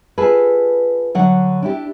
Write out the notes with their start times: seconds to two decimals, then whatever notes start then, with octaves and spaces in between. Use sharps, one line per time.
0.18 F4 G#4 A4 B4
1.15 D3 F#3 F#5
1.63 D4 E4 G4